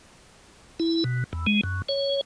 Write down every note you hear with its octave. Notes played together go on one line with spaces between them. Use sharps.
E4
B2
E2
G#3
F#2
C#5